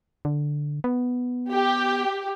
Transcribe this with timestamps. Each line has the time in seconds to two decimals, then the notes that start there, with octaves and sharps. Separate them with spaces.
0.25 D3
0.84 B3
1.52 G4